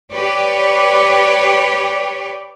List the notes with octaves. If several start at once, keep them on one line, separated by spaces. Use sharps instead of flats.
G4 B4 C#5 D5